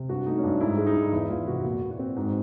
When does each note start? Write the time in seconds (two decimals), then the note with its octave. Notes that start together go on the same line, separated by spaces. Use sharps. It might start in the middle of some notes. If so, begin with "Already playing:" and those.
Already playing: C3
0.09 G2 F#4
0.27 A3 D#4
0.38 C#4
0.43 G2 D4
0.61 G#2 E4
0.78 G#3
0.86 D#4
0.96 G#2
1.12 E2 E4
1.29 E2 F4
1.47 C3 F#4
1.64 A#2 F#4
1.81 A#2
1.91 F#4
1.99 C4
2.16 G#2